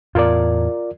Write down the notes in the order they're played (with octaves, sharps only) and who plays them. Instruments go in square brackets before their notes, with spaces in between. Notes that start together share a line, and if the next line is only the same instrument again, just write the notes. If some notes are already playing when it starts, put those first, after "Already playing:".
[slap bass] E2 A2 [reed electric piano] F4 A#4 D5